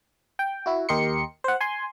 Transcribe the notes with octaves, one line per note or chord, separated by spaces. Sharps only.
G5
E4 F#4
D#2 G4 A#4 D#5 C6 C#7
C5 F#5
G#5 C6